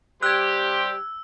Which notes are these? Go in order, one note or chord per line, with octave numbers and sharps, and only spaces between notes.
G3 G4 C5 E6 F#6 G#6